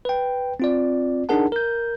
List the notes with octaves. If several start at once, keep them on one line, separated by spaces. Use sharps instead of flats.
B4 G5
C4 F4 D5
D4 D#4 G#4 A#4 F#5 A5
A#4 G6